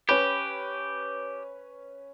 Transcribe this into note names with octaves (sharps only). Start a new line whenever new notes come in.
C#4 G4 B4